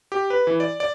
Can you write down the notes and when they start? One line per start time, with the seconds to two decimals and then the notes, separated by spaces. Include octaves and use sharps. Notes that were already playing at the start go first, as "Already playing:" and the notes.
0.12 G4
0.30 B4
0.47 E3
0.60 D5
0.80 D5